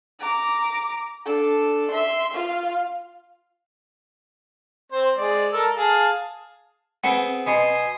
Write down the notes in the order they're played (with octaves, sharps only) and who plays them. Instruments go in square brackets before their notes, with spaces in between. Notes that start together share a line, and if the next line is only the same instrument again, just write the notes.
[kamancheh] A#5 D6
D4 A4
E5 C6
F4 F5
[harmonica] C4 C5
G#3 D5
A4 A#4
G#4 F5 A5
[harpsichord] B3 C4 G#4 [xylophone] F#5
[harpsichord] B2 [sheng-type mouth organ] G#5 C6 D#6